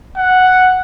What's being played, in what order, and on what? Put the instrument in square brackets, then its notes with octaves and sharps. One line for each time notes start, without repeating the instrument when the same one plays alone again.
[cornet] F#5